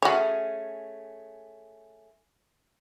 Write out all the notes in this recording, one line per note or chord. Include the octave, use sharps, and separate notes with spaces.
A3 C#4 F#4 G#4 C#5